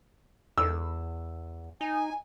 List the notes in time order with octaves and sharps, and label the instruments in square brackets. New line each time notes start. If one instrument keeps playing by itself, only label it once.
[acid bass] E2 [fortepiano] E6
[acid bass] D#4 [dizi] G#5